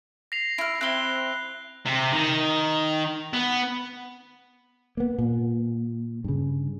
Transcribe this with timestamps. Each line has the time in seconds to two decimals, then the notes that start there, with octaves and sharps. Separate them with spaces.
0.32 A#6 C7 F7
0.58 E4 F6
0.81 C4 E4 F#6 G7
1.86 C3
2.12 D#3
3.34 B3
4.97 A#3 B3
5.18 A#2
6.24 G2 C#3